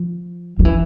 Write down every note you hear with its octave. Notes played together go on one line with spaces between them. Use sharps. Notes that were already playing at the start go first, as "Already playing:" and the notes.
Already playing: F3
F3
E3